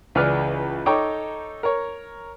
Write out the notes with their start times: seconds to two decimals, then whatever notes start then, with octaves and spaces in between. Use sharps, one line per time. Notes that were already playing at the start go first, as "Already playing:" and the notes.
0.15 C#2 E3 G#4 B4 D5 F6
0.86 D#4 A4 C#5 G5 A#5 D6
1.63 A#4 C#5